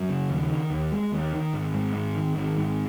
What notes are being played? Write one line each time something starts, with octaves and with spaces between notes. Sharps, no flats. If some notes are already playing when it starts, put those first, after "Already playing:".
Already playing: F#2
C#3
D#2
D#3
D#2
G#3
D#2
D#3
G#1
G#2
G#1
D#3
G#1
G#2